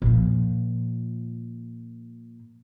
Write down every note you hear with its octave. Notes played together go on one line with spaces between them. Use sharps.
A#2 F3